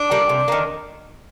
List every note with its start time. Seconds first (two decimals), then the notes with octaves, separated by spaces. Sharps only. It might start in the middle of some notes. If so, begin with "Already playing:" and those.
Already playing: D4
0.11 G3 A#3
0.29 C3
0.48 D#3 A#3